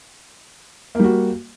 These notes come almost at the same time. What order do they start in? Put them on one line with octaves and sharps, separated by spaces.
A#3 G3 F#4